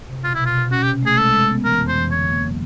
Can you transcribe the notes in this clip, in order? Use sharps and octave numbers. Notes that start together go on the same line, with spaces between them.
C3
B2 F4
E4
B2
F4
B2
C#4 F#4
G4
C3
A3 G#4
G#3 A4
G#3
B3
E3 A#4
F2
C5
E3
D3 C#5
A#3
F#3